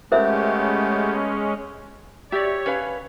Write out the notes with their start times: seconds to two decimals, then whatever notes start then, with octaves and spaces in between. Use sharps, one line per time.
0.12 G#3 A3 B3 C#4 G4 A#4 C5 E5
2.32 G4 C#5 D5 E5
2.66 C#4 B4 F5